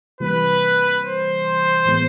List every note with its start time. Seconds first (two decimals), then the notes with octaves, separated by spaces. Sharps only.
0.20 C3 E3 G3 A#3 B4
1.03 C5
1.86 A2 E3 G#3 B3